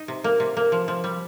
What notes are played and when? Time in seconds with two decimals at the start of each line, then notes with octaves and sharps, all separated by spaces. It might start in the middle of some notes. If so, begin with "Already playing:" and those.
Already playing: D#4
0.08 C3
0.24 A#3
0.40 C3
0.57 A#3
0.72 F3
0.88 F3
1.04 G3